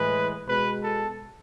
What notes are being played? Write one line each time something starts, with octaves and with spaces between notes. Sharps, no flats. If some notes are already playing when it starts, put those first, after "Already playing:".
Already playing: A2 E3 G#3 B4
B2 G#3 B4
A4